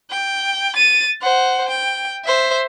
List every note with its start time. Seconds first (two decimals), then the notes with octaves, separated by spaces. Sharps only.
0.11 G5
0.76 A6 D#7
1.22 C5 F#5
1.69 G5
2.25 C5 E5